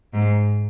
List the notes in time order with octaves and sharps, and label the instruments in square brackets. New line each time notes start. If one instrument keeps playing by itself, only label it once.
[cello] G#2